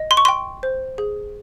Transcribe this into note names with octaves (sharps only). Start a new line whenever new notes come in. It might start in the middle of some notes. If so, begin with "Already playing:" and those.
Already playing: D#5
C6
C#6
G5 C6
C5
G#4